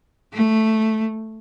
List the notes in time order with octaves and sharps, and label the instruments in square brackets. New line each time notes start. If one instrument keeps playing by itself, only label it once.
[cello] A3